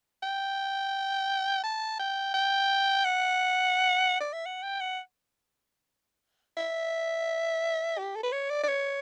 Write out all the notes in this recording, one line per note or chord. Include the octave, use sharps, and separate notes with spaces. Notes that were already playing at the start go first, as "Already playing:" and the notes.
G5
A5
G5
G5
F#5
D5
E5
F#5
G5
F#5
E5
G4
A4
B4
C#5
D5
D5
C#5